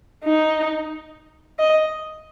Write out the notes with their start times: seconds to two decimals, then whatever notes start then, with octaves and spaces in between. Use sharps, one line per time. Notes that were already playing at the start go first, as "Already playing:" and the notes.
0.25 D#4
1.59 D#5